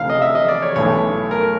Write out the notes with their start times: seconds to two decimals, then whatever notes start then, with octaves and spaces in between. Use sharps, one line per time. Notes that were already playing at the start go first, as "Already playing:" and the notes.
Already playing: D2 C3 E3 F5
0.10 D#5
0.22 E5
0.35 D#5
0.48 D5
0.62 C#5
0.76 B1 A2 E3 C#5
1.31 A#4